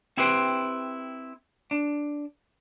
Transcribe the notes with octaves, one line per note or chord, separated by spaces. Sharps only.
C4 E4 G4 B4 C5 G5
D4